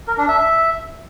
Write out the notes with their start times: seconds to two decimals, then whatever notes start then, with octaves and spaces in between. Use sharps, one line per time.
0.08 A#4
0.18 D4
0.28 E5
0.39 E5